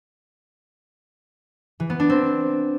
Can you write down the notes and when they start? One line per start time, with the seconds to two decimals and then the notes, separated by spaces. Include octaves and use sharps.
1.80 E3
1.90 B3
2.00 D4
2.10 C4